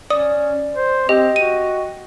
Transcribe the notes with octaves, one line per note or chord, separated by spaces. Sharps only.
C#4 D5 D#6
C5
C4 G4 D#5 G5
F#4 D#7